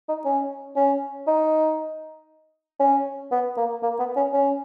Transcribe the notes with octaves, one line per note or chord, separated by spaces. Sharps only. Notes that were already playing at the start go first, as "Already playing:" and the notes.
D#4
C#4
C#4
D#4
C#4
B3
A#3
A#3
B3
C#4
C#4